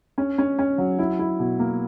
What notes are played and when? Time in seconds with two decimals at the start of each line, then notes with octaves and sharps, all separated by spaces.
0.18 C#4
0.38 C#4
0.59 C#4
0.78 F#3
0.99 E4
1.19 E4
1.39 B2
1.59 A#3